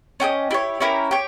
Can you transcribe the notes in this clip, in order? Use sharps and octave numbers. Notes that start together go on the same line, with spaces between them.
C#4 G4 A#4 D#5
E4 G4 C#5
C#4 E4 G4 A#4
G4 C#5 G5